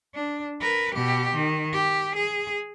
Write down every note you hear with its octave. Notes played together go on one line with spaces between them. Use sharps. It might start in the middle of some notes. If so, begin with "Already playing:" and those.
D4
A#4 B4
B2 G4
D#3
G4
G#4